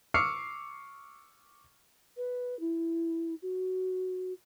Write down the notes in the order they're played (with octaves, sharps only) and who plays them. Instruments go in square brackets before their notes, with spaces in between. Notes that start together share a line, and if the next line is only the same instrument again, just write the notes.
[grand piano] C#6 D6 E6 F6 C7 C#7
[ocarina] B4
E4
F#4